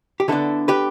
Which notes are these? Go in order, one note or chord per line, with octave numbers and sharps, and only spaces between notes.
G4
D3 B3 D4 E4 A4
G4 B4